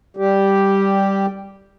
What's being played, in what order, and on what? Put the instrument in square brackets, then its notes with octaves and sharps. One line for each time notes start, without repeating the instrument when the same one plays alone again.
[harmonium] G3 G4